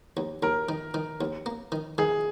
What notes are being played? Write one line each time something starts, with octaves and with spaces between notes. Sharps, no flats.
D#2
D#2 A#4
D#3
D#3
D#2
A#3
D#3
D#3 G#4